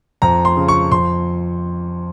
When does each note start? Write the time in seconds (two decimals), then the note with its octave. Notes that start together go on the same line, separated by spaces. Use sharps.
0.22 F2 A#5
0.45 C6
0.57 C#3
0.68 C#6
0.91 F2 C6